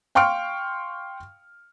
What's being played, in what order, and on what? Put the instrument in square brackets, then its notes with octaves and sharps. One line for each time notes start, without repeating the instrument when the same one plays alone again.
[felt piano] F5 G5 C6 C#6 F6 D7